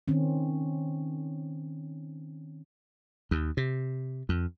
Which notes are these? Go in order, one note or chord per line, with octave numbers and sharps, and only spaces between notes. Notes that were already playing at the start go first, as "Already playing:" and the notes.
D#3 C4 C#4
D#2
C3
F2